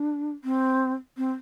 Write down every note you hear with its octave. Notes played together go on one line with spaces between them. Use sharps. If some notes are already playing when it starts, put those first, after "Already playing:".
Already playing: D4
C4
C4